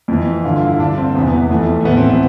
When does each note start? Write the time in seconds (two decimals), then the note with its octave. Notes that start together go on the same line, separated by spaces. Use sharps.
0.08 F2 E3
0.44 G2 D3 F4
0.56 F4
0.67 E4
0.79 G2 D3 D4
0.98 C4
1.15 E2 C3 E3 B3
1.27 B3
1.38 B3
1.50 F2 E3 A3
1.80 A3
1.85 A2 E3 B3
1.97 C4
2.09 B3